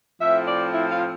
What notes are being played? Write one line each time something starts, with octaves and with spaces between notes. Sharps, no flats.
A2 F3 C4 E5
D5
E4
F4